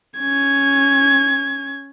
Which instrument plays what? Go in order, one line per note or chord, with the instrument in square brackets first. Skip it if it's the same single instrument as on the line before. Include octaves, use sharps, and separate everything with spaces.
[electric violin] C#4 G#6